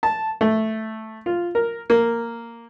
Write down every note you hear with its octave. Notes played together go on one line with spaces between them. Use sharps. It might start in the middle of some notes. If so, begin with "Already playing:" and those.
A5
A3
F4
A#4
A#3